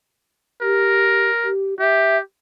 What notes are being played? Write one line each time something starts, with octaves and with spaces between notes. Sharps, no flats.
G4 A#4
G4
G4 E5